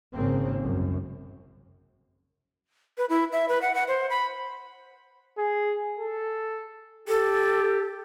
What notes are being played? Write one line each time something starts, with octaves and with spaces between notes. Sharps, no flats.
G#1 C#3 A#3 C4
C2 F#2
B4
E4
E5
B4
F#5
F#5
C5
B5
G#4
A4
G4 A4